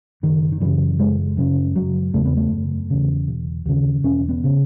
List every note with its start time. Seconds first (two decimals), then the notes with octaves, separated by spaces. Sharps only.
0.23 F#1 D#3
0.52 D#3
0.60 F#2 C#3 E3
0.99 F#1 G#3
1.37 F#2 C#3
1.75 F#1 F#3
2.14 E2 C#3 A3
2.25 B3
2.37 A3
2.51 F#1
2.90 E2 C#3
3.28 E1
3.66 D#2 C#3
4.04 E1 C#4
4.29 B3
4.44 C#3